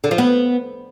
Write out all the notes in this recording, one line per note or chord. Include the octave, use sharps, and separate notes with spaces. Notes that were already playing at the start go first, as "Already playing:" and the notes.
D3
F3
B3